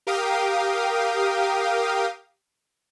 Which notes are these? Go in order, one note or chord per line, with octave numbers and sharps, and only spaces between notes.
G4 A#4 F5 G5 D#6